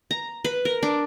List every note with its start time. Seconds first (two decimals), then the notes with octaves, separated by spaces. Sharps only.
0.11 A#5
0.45 B4
0.65 A#4
0.83 D4